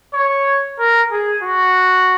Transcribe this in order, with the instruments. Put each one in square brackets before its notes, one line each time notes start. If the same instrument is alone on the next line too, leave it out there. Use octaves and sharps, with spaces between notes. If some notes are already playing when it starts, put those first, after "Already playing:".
[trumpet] C#5
A#4
G#4
F#4